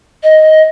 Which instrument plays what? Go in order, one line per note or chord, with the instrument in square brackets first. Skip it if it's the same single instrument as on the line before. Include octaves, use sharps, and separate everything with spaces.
[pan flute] D#5